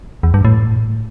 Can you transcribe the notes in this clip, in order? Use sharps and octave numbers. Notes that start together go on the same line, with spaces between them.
E2
G2
A2